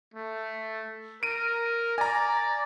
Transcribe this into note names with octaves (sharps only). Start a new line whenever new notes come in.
A3
A#4 D7 D#7
D5 G#5 A#5